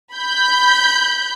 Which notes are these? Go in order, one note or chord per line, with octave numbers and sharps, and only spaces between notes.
B5 G6